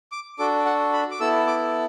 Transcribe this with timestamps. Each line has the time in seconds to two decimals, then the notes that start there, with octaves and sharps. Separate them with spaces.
0.12 D6
0.38 D4 F#4 A4 D6
0.65 F#5
0.93 B5
1.11 D6
1.20 B3 E4 A4 E6
1.47 D6